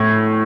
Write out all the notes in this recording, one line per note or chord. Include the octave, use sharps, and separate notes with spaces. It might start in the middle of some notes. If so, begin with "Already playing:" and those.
Already playing: A2 G#6